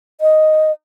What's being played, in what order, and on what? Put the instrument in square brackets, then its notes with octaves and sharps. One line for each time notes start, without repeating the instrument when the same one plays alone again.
[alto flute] D#5